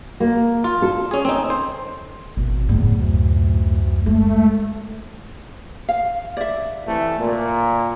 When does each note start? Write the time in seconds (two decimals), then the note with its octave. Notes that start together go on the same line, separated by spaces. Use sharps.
0.20 A#3
0.64 F4
0.82 A4
1.11 C#4 G#4
1.25 C4 D#4
1.50 C5
2.37 G#1 B2
2.69 F#1 E2 A2
3.00 D2
4.06 G#3 A3
5.89 F5
6.37 D5 E5
6.85 C3 E3 A3
7.19 A#2